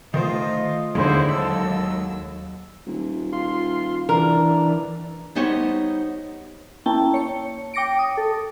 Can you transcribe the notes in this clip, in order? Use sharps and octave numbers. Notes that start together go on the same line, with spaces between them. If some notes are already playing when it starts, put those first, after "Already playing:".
D#3 A3 F4 A#4 C5 D#5
D#2 D3 G#3 E4 C5
F#3 A4 E6
D#1
F4 C6
E3 D4 A#4
G3 B3 D#4 G4 C5 C#5
A#3 C#4 E4 G5 A5
C#5 C#7
G5 D6 A#6 C#7 D7
D#6
A4